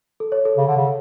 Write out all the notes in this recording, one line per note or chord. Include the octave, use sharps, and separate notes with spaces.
A4
C#5
A4
C#3
D3
C#3